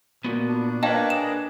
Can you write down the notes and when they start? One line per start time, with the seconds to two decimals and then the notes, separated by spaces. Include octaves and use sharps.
0.24 A#2 B3 F#4
0.48 D4
0.83 A#3 D4 B4 C#5 D#5 F5 G5 A5
1.10 G#4 A#4 E7